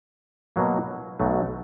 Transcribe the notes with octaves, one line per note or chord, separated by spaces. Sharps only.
B2 F#3 A#3
B1 B2 F#3 A3